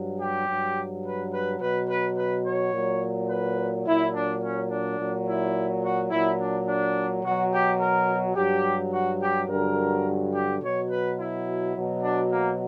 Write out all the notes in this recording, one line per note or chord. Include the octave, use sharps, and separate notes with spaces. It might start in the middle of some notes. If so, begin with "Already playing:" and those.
Already playing: G2 F#3
G4
G2 F#3
B4
B4
B2 F#3 B4
B4
B4
C#5
A#2 F#3
B4
A#2 F#3 E4
D4
C#4
D4
A#2 F#3
E4
F#4
A#2 F#3 E4
D4
D4
B2 F#3 F#4
G4
A#4
G2 F#3 G4
F#4
G4
G2 D3 F#3 A#4
G4
B2 F#3 C#5
B4
E4
B2 F#3
D4
A#3